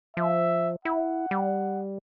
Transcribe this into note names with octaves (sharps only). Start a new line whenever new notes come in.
F3 E5
E4 F#5
G3